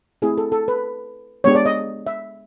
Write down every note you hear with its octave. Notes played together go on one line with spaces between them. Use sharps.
A3 C4 E4 G4 G#4
A4
A4
B4
G#3 B3 D4 G4 C#5
D5
D#5
E5